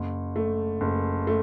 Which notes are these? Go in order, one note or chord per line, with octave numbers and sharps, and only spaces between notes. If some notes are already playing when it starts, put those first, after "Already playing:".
Already playing: F#1
A3
F#1
A3